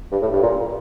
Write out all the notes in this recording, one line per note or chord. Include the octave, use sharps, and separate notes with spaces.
G2
A2
G2
A#2